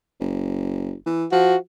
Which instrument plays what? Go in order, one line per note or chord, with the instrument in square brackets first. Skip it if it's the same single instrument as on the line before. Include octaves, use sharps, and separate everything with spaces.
[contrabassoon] F#1
E3
[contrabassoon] F3 [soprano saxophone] F#4